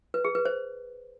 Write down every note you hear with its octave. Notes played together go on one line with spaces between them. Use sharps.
B4
G#4
B4
C5